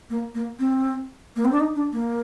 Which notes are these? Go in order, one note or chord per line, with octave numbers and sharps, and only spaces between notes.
A#3
A#3
C4
A#3
C4
D4
D#4
D4
A#3